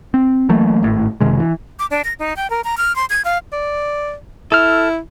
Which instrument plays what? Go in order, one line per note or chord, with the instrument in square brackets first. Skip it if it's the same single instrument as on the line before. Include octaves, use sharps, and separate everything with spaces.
[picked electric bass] C4
E3 F#3 A3 A#3
G#1 A2
F#1 C3 D#3 G#3
E3
[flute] D6
D4
A#6
D#4
G5
A#4
A#5
F6
C6
G#6
F5
[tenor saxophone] D5
[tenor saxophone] E4 [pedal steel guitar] A4 F6